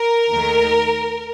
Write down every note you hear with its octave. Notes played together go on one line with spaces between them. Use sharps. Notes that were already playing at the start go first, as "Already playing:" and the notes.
Already playing: A#4
D#2 D#3 A3